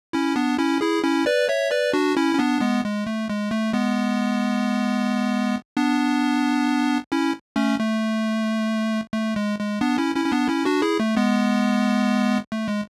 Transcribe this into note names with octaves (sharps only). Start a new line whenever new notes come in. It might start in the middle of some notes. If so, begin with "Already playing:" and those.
C#4 E4
B3 D4
C#4 E4
E4 G#4
C#4 E4
B4 D5
C#5 E5
B4 D5
D4 F#4
C#4 E4
C#4
B3 D4
G#3 B3
G#3
A3
G#3
A3
G#3 B3
B3 D4
C#4 E4
A3 C#4
A3
A3
G#3
G#3
B3 D4
C#4 E4
C#4 E4
C#4
B3 D4
C#4 E4
D4 F#4
E4 G#4
A3
G#3 B3
A3
G#3